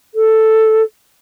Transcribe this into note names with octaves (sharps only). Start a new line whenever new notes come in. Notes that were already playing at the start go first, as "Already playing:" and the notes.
A4